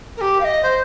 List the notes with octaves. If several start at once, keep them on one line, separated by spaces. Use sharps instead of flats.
A#4
G4
F5
D#5
C5